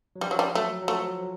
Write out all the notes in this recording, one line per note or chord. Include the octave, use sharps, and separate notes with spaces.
F#3
F3 G3
F#3
G3
F#3 A3
F#3
F3 A3